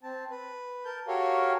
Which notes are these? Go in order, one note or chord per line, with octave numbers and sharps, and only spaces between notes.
C4 A5
B4
A#4 A5 G6
F#4 G4 A4 A#4 C#5 F5